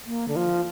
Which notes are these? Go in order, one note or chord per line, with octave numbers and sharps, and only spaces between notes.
A#3
D3
F3